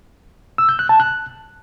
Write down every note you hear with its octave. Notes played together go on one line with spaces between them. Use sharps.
E6
G6
F#6
A5
F#6